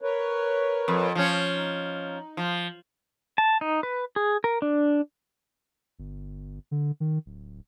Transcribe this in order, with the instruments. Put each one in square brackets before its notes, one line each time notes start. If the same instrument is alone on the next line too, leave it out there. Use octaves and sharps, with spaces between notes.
[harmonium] A#4 B4 C#5
[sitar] F2
F3 C#4
[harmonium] D#4
[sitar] F3
[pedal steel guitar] A5
D#4
B4
G#4
A#4
D4
[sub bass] G1
D3
D#3
D1